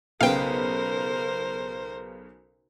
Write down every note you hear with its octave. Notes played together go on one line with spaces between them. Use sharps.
B1 C#3 B3 A#4 C5 F5 G5